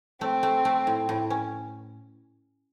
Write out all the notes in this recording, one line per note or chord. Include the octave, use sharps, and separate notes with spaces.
A3 C4
A3
A3
A2
A2
C#4